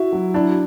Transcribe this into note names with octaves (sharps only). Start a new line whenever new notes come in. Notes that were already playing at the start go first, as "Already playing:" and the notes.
Already playing: E4 F#4
F#3
D4 E4